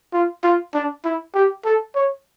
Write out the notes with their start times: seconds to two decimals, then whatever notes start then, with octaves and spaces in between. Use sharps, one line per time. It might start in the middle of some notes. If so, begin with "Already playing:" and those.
0.13 F4
0.43 F4
0.74 D4
1.04 E4
1.35 G4
1.65 A4
1.95 C#5